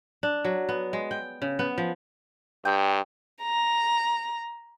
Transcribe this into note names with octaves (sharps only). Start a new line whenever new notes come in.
D4
F#3
B3
G#3
G5
C#3
B3
F3
G2 G5
A#5